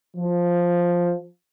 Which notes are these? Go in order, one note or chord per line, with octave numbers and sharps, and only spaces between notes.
F3